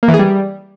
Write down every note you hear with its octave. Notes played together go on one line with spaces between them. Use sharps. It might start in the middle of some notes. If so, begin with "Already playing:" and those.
A#3
E3
G#4
G3